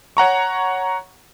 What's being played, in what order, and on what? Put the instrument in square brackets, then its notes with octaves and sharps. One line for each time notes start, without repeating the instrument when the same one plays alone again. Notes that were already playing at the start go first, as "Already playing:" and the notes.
[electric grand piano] C#5 F#5 A#5 C#6